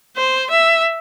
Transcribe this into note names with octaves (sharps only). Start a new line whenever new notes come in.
C5
E5